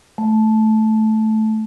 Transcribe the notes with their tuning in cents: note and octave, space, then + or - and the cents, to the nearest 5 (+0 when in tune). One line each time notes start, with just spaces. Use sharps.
A3 -10